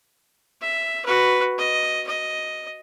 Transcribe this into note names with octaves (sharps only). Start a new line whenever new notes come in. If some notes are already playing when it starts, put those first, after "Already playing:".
E5
F#4 B4
D#5
D#5